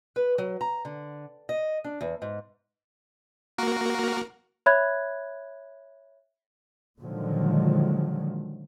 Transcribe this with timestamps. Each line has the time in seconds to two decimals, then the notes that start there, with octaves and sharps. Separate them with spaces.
0.16 B4
0.38 F#3
0.61 A#5
0.85 D3
1.49 D#5
1.84 D4
2.01 E2
2.22 G#2
3.58 A#3 F#4 A#4
4.66 C#5 E5 B5 F#6 G#6
7.01 A#2 D3 D#3 F3 F#3 G#3